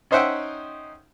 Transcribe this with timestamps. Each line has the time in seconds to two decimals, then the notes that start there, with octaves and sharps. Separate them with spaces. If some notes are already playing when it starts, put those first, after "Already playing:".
0.11 C#4 D#4 C5 E5 F#5 G5